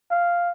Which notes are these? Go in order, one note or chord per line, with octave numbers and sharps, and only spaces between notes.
F5